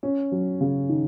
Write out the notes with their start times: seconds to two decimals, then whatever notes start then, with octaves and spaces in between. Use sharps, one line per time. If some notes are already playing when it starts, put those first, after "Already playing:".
0.03 C#4
0.32 F#3
0.61 C#3
0.89 D#3